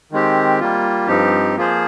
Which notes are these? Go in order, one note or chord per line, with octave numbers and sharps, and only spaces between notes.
D#3 G#3 C4 G4
G3 A#3 F4
G2 F3 C4 D#4 G4
F3 A#3 F4 G#4 C5